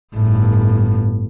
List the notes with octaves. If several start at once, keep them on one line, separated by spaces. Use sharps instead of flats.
G1 A2